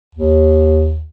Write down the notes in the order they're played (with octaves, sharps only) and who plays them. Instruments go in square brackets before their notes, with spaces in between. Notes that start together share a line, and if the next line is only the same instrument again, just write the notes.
[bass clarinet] D#2